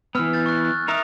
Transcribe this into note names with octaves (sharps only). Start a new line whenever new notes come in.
E3 B3 E6 F6
G6 A6
C#6 F#6
F#6
D#4 A#4 E5 D#6 F7